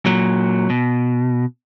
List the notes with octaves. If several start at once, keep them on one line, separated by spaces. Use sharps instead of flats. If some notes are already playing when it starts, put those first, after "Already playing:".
A#2 F#3
B2